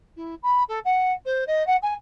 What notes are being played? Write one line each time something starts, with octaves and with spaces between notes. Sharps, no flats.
E4
B5
A4
F#5
C5
D#5
F#5
G#5